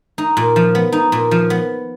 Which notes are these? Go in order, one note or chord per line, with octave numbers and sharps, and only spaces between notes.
D#4
A#2
F3
B3
D#4
A#2
F3
B3